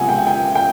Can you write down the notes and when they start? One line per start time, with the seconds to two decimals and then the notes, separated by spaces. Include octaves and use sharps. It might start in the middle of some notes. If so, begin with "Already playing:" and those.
Already playing: C#2 C3 F#5 G#5
0.09 G5
0.27 G5
0.55 G5